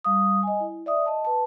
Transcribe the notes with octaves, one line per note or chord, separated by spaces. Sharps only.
G3 F5 D#6
D#5 G#5
E4
D5 E5 D#6
D#5 A5
B4 A5